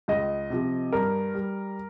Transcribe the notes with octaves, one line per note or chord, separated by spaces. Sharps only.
C#2 D#5
C3 F3
G2 A#4
G3